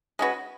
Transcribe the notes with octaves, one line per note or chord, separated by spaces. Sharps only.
G#3 C#4 F#4 B4